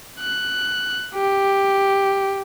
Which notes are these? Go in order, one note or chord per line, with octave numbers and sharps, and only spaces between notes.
F#6
G4